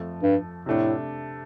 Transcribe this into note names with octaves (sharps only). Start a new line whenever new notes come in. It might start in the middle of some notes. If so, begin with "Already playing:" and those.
Already playing: F2 F3 A3
G2
A2 C3 A3 D4